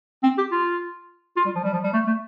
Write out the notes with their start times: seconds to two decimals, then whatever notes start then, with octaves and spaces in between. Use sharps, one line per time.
0.23 C4
0.38 G4
0.52 F4
1.37 F4
1.45 G3
1.55 F3
1.64 G3
1.73 F3
1.84 G3
1.93 A3
2.07 A3